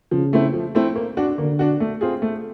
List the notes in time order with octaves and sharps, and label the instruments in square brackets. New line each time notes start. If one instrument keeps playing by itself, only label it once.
[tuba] C#3 [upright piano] F3
[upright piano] A3 C4 E4
F3
A3 C4 E4
A#3
D4 F#4
[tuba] D3 [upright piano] A#3
[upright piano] D4 F#4
A3
C4 F4 G#4
A3